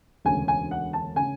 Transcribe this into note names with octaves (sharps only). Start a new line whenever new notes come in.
E1 D2 C#3 G#5
G#5
F#5
A5
C#3 G#5